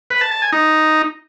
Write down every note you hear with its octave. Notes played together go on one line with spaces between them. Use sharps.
B4
A5
A5
G#5
D#4